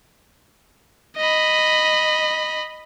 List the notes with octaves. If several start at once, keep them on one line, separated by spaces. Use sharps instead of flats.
D#5 B5